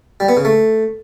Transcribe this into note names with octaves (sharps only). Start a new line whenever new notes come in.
G3
B3
C#3
A3